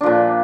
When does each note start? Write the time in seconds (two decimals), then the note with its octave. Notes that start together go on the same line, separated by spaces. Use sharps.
0.01 D4
0.03 F3
0.06 A#2